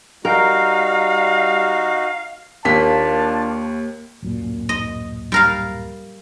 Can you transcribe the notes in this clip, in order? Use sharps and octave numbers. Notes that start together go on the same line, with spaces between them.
G3 D#4 F#4 A#4 F5 G5
D#2 A#3 D4 F4 A5 B6
D1 F#2 A#2
D#5
G3 A#4 F5